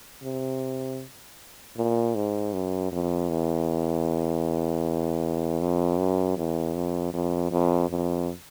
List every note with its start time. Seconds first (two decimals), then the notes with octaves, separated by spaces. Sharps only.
0.23 C3
1.77 A#2
2.15 G#2
2.53 F#2
2.92 F2
3.29 E2
5.61 F2
5.98 F#2
6.37 E2
6.75 F2
7.14 F2
7.52 F2
7.90 F2